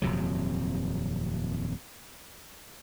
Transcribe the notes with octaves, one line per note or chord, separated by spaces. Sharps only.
D#1 F2 C3 F#3